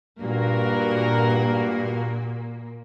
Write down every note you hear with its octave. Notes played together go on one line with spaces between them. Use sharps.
G2 A#2 A#3 F#4 A#4